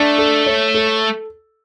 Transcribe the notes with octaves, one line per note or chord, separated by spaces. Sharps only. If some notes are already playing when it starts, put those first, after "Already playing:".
Already playing: A3 D4
A4
C#5
A4